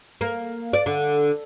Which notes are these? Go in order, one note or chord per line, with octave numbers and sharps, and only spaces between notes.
A#3
D5
D3